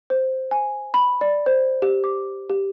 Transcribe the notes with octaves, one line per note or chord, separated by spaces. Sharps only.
C5
G#5
B5
D5
C5
G4
D6
G4